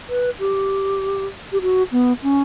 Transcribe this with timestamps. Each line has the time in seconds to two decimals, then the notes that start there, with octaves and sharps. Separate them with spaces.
0.09 B4
0.40 G4
1.52 G4
1.62 F#4
1.92 B3
2.23 C#4